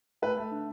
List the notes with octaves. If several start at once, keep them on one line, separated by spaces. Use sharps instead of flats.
A3 B4
A3
D3